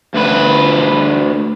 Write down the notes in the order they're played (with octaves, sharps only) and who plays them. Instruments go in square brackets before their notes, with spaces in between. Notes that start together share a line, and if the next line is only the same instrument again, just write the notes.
[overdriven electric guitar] D2 B4